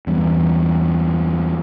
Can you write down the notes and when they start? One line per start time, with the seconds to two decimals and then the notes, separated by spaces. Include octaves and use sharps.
0.07 E2 G2